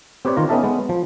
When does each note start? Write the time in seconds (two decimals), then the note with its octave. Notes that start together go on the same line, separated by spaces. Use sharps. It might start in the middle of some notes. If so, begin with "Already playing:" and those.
0.25 C4 G4 B4 C#5 D5
0.37 D#3 F4 A#5
0.49 B3 C#4 D#4 A4 E5 A5
0.63 G#3 B3
0.89 F3